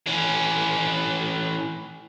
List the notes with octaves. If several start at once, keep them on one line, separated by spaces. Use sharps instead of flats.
E3 C#4